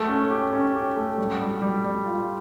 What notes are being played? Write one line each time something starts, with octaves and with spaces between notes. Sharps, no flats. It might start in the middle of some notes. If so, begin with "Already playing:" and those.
Already playing: A3
C#4
G4
C#4
G4
A3
G3
G3
G3
G3
F4